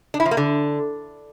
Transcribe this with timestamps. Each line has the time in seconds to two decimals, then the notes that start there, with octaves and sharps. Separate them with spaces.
0.14 D4
0.20 E4
0.26 F3
0.31 A#3
0.37 D3